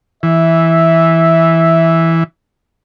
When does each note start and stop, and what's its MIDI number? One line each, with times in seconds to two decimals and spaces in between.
0.23 2.24 52
0.23 2.19 76